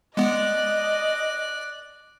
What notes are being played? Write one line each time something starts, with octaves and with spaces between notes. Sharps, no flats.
G#3 B3 D5 D#5 F#6